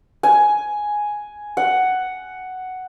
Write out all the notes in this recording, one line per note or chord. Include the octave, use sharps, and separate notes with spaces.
G#5
F#5